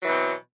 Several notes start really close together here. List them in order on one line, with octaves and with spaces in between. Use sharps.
F#3 E3 B2 C4